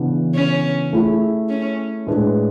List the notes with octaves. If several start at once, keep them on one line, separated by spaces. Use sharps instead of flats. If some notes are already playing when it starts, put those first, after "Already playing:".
Already playing: C#3 E3 B3 D4
C#4
A3 E4 G#4
C#4
A2 G#3 D4 G#4 B4